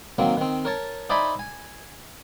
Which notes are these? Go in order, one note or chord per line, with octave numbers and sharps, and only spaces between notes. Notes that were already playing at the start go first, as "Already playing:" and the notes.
D#3 F#3 A#3 C4
D#3 C4
A#4 C#5 A5
D#4 C5 D5 E5 G#5 B5
G#5